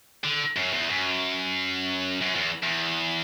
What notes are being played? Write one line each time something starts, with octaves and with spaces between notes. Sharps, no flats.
D3
F#2
E2
F#2
F#2
E2
E2